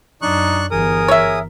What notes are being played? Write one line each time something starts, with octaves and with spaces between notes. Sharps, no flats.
F#2 D4 D#4 C#6 F#6
G1 E3 G#4 A#4 D#6
C#5 E5